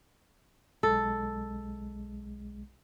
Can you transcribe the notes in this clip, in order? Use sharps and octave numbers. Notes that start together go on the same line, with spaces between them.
B1 G#3 A4